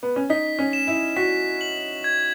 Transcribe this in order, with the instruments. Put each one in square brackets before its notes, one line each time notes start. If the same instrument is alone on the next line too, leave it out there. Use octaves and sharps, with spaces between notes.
[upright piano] B3
C#4
[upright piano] D#4 [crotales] B6
[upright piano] C#4
[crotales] E7
[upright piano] E4
[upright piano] F#4 [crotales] B6
[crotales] F#7
G#6